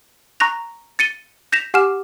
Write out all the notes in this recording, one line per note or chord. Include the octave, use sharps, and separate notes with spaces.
A#5 C#6 F#6 A#6 F7
A6 C#7 D#7 G7
G6 A#6 B6 E7 F7
G4 F#5 G#5 D6 F6 E7